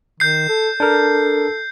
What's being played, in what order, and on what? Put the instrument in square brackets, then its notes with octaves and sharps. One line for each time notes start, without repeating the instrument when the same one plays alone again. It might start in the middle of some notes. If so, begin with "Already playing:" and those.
[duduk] D#3 [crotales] G6 C7
[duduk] A4
[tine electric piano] D4 A#4 [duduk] A4